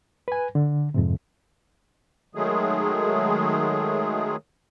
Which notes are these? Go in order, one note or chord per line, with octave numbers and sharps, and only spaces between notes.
B4 G#5
D3
F2 G#2 C3
D#3 F#3 G#3 A3 G#4